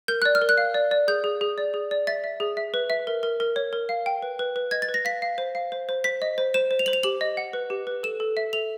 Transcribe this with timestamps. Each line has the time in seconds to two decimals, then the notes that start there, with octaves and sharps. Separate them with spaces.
0.08 A#4 G6
0.22 D5 F#6
0.35 F6
0.42 A#4
0.49 F#6
0.58 F5
0.74 D5
0.91 D5
1.08 G#4 G6
1.24 G#4
1.41 G#4
1.58 D5
1.74 G#4
1.91 D5
2.07 E5 A6
2.24 E5
2.40 G#4
2.57 E5
2.74 B4
2.90 E5
3.07 A#4
3.23 A#4
3.40 A#4
3.56 C#5
3.73 A#4
3.89 F5
4.06 G5
4.22 B4
4.39 B4
4.56 B4
4.71 D#5 G#6
4.82 A6
4.89 B4
4.94 A#6
5.05 F5 B6
5.22 F5
5.38 C5
5.55 F5
5.72 C5
5.89 C5
6.04 C5 B6
6.22 D#5
6.38 C5
6.54 C5 E7
6.71 C5
6.79 F7
6.86 C5 F#7
6.93 F7
7.03 G4 F#7
7.21 D#5
7.37 F#5
7.53 B4
7.70 G4
7.87 B4
8.03 A4 E7
8.20 A4
8.37 E5
8.53 A4 F7